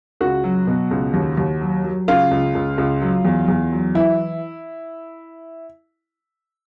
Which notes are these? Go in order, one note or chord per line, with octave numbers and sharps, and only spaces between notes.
C#2 F#4
F#3
B2
C#2
D#2
D#2
F#3
F#3
C#3 F4
C#2
C#2
C#2
F#3
E2
E2
F#3
E3 E4